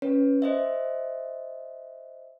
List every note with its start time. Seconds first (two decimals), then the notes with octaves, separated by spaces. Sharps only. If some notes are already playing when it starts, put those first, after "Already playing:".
0.02 C#4 B4 C#5
0.42 C5 D#5 E5